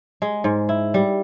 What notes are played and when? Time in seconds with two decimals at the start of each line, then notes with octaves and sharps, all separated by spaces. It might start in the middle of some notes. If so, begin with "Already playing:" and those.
0.22 G#3
0.44 G#2
0.69 E4
0.94 G3